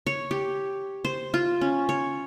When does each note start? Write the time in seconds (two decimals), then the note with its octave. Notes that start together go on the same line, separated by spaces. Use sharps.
0.07 C#5
0.31 G4
1.05 C5
1.34 F4
1.61 C#4
1.89 C#5